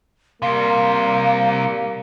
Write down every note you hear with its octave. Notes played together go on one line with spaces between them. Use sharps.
C3 G3 A#3 F5